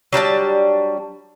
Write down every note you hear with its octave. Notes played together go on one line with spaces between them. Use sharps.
F#3 G3 D4 A5